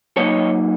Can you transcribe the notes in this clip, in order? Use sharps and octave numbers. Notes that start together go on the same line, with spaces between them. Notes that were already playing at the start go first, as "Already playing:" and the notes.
F#3 A#3 D#4 C#5 D#5